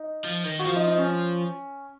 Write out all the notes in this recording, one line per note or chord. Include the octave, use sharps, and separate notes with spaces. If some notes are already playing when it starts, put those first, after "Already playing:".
Already playing: D#4
F3
D#3
F#4
F3 F4
D#4
D#4
C#4